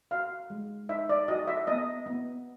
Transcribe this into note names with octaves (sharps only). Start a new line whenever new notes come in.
F#4 F5
G#3
D#4 E5
D5
F#4 D#5
E5
B3 D#5
B3